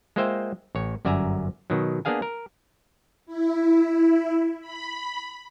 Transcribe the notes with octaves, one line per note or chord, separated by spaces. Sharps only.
G#3 A#3 F4 C5 E5 G5
A1 C#5
G1 F#2 D5 E5 G#5 A#5
B2 D#3 F#3
A#3 B3 D4 G#4 F5 G#5
A#4
E4
B5